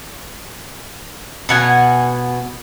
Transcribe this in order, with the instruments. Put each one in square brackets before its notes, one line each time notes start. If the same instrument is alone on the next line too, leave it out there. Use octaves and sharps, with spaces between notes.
[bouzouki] B2 F#5 G#5